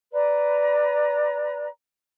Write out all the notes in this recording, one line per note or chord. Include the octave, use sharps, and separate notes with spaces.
B4 D5 A#5